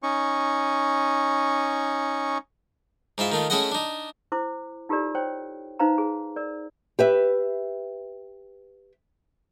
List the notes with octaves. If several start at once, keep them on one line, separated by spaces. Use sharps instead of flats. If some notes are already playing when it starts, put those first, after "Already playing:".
C#4 D#4 C#6
G#2 E4 F4 E5
D#3 A3 F4
A3 C#4 E4 G#4 D#5 F#5
D4 D#4
E4 C5 D6
D#4 F4 G4 A4 A#4 D5
C5 C#5 G5
D#4 B4 C5 F5 A#5
G#4
A#4 D5
G4 B4 E5